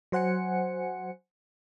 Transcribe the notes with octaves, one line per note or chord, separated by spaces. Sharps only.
F#3 C5 F#5 G#5 C#7